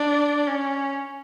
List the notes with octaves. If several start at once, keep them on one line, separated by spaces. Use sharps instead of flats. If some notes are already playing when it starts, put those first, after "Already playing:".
Already playing: D4
C#4